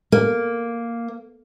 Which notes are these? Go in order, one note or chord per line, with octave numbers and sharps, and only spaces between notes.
A#3